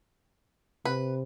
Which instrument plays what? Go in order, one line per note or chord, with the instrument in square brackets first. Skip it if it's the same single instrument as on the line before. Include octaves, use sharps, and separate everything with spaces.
[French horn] C3 [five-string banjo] B4